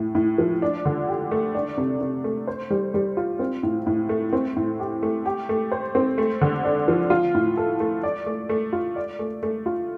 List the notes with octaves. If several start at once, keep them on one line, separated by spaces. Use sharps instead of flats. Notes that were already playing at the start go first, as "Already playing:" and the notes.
Already playing: A2
A2
F3
D4
D3
G4
A3
D4
C3
C3
A3
C5
G3
G3
F4
C4
A2
A2
A3
C4
A2
G4
A3
G4
A3
C5
C4
A3
D3
D4
F3
F4
A2
A4
A3
D5
A3
A3
F4
D5
A3
A3
F4